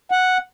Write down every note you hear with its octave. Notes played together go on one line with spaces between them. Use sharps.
F#5